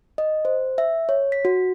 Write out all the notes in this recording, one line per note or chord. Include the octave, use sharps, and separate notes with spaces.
D#5
C5
E5
C#5
B6
F#4